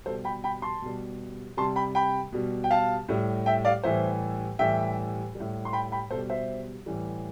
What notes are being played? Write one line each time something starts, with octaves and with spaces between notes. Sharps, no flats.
B2 G3 A4 C5
G5 B5
G5 B5
A5 C6
B2 G3
C3 G3 A5 C6
G5 B5
G5 B5
B2 G3
G5
F5 A5
A2 G3
E5 G5
D5 F5
A2 E3 G3 C5 E5
A2 E3 G3 E5 G5
G3
A2
C6
G5 B5
G5 B5
B2 A4 C5
G3
C5 E5
A2 E3 G3